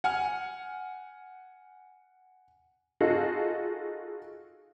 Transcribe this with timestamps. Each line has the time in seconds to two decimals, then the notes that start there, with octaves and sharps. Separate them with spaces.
0.04 F#5 G#5 F6
3.00 D#4 F4 F#4 G#4 A4